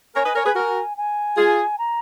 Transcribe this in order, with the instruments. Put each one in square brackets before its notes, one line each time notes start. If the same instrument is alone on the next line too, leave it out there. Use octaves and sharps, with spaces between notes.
[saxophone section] A#4 C#5 [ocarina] G#5
[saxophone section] B4 D#5
A#4 C#5
G#4 B4
F#4 A#4
[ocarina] G#5
[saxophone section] F4 G#4
[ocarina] A#5